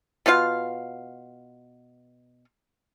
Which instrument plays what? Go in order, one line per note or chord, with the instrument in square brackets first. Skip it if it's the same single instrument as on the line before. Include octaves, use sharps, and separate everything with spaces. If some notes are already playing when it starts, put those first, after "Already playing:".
[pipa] B2 B3 F4 F5